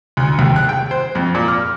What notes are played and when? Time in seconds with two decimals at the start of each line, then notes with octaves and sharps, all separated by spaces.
0.17 D2
0.39 D#2
0.56 F#6
0.69 G5
0.91 C5
1.15 F2
1.35 A#2
1.48 F6